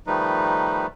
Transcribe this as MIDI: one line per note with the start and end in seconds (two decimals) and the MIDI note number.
0.07 0.86 51
0.07 0.86 53
0.07 0.86 55
0.07 0.86 57
0.07 0.86 63
0.07 0.86 71